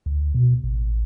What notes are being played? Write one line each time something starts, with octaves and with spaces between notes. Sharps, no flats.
D2
B2
A1